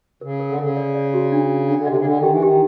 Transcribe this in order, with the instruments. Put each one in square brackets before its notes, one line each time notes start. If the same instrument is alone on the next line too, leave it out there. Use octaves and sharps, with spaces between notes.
[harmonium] C#3 [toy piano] A#4
[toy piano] A#4
[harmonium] D3
[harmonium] C#3 [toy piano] A#4
[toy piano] D5
D5
F#4
D4
D4
[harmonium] D3 [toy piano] D4
[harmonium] D3
[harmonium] C3 [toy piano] D#5
[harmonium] C#3
[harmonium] D3 [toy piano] D4
[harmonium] D#3
[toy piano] G4
[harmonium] E3
[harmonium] D#3 [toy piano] G4